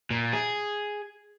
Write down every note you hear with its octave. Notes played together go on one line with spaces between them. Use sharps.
A#2
G#4